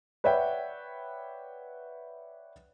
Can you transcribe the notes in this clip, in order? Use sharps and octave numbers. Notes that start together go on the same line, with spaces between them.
B4 C#5 D5 E5 F#5 G5